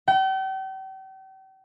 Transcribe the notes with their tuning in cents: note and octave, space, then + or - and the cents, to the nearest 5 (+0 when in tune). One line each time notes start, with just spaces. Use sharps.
G5 -40